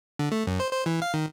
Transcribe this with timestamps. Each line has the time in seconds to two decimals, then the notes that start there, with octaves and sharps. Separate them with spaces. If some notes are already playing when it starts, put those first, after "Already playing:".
0.19 D3
0.32 A3
0.47 F#2
0.60 C5
0.73 C5
0.86 E3
1.02 F5
1.14 D#3